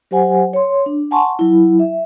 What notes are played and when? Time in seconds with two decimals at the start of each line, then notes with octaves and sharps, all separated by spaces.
0.11 F#3 G4 C5 F#5 G#5
0.53 C#5 C6
0.86 D4
1.11 F#5 G#5 A5 C6 C#6
1.39 F#3 E4
1.79 E5